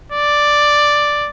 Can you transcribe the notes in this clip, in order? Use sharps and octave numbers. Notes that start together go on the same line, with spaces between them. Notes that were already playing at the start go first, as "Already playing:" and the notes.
D5